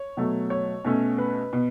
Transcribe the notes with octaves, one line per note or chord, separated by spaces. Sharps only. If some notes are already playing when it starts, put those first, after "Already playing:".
Already playing: C#5
B2 F#3 A3
C#5
B2 A3 C#4
B4
B2